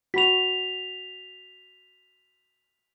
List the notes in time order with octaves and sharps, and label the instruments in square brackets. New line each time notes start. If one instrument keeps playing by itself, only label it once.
[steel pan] F#4 B5 [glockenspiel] B6 F7